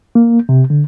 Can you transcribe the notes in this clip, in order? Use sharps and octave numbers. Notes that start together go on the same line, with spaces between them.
A#3
C3
D3